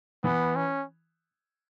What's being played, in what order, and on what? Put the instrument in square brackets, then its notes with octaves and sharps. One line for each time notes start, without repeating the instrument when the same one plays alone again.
[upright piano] E3 [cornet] B3
[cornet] C#4